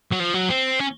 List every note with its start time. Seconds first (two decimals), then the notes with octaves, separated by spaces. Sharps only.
0.12 F#3
0.19 F3
0.34 F#3
0.49 C4
0.79 C#4